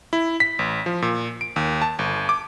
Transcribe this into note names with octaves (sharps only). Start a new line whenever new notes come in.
E4
B6
A1
F3
A#2
D7
D#2
A5
G1
D6